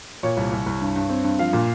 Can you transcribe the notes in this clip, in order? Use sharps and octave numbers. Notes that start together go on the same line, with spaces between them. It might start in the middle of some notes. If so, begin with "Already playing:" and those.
A#2 C#5
C2
C2
C2
G2
G2
C4
G2
F3 F5
A#2